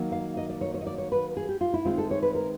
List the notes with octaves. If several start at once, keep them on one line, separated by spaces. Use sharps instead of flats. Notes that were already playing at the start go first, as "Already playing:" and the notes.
Already playing: D#3 F#3 A#3
F5
D#5
D5
C#5
C#5
D#5
D5
C#5
B4
G#4
G4
F4
E4
D#3 G#3 C4 F4
A4
C#5
B4
A#4